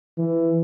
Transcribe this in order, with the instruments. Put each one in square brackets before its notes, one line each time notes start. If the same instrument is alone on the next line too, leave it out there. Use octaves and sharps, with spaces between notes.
[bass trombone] E3